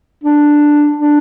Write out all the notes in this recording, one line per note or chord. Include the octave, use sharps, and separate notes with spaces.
D4
D4